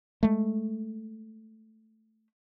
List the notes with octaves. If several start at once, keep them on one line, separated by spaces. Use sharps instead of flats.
G#3 A3